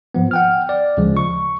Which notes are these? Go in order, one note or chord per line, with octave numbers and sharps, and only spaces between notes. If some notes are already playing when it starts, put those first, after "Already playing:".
G#2 F3 B3
F#5 G5 F6
D5
D2 C#3 F3 G#3
C#6